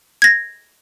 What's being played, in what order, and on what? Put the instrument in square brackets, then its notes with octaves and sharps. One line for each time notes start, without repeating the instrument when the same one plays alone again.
[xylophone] G#6 A#6